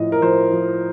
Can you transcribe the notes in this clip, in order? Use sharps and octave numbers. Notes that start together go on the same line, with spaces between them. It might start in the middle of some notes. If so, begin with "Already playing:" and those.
Already playing: A2 F3 D#5
A#4
F3 C5
F3